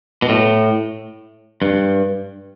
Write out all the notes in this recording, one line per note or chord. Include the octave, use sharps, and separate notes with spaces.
B2
A2
G2